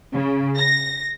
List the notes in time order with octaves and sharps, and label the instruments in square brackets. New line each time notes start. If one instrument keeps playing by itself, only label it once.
[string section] C#3
A#6